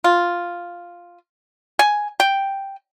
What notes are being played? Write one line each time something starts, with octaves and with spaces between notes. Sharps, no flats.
F4
G#5
G5